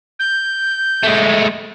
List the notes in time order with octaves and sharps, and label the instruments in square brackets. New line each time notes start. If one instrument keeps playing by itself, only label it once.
[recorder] G6
[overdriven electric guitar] G#3 A3